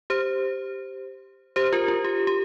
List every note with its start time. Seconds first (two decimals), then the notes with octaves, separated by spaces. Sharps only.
0.10 G4 C5
1.56 G4 C5
1.73 F4 A#4
1.88 F4
2.04 G4
2.27 G4